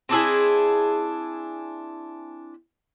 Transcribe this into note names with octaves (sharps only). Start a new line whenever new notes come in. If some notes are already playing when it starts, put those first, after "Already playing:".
C4 D4 E4 G#4